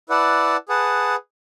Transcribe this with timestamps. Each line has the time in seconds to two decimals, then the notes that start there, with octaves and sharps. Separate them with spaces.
0.09 E4 B4 D5 F#5 A5
0.69 G#4 B4 F#5 A5